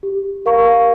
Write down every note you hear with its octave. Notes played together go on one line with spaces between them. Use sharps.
G4
A#4 F5 A#5 C#6